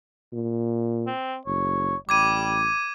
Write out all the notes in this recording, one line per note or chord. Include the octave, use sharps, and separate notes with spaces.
A#2
C4
F#1 C#5
A1 G3 D6 G#6 D#7